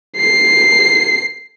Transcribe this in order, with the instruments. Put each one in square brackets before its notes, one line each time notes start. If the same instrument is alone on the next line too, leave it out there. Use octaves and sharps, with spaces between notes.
[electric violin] C7